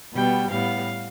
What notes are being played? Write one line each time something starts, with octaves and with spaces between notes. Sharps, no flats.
B2 G3 B3 G5
A2 G3 B3 F5